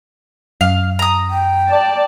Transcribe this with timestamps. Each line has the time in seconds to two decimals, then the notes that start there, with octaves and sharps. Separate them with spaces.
0.61 F#2 F5
0.99 A#5 D#6
1.30 G5
1.68 D5 A5